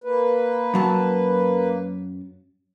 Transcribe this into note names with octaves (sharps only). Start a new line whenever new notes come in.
A#3 B4
F#2 F#3 A5